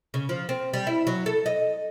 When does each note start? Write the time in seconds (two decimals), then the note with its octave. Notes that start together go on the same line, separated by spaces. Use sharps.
0.14 C#3
0.29 F3
0.49 C4
0.73 G3
0.87 E4
1.07 F#3
1.26 A4
1.46 D#5